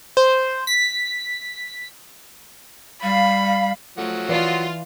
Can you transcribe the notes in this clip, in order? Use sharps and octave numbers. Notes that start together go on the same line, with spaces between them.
C5
B6
G3 F5 B5
F3 F#3 A3 F#5
E3 F4 B4 D5